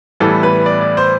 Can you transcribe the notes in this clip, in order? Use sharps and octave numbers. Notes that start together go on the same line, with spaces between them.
A2 E3 G3 B3 A4
B4
D5
D5
C5